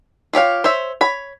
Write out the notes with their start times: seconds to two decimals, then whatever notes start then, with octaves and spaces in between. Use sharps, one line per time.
0.33 F4 G4 C#5 F5
0.64 C5 C#5 E5
1.01 C#5 B5